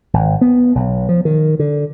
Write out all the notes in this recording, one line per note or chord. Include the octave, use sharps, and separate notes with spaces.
G#1
B3
B1
F3
D#3
D3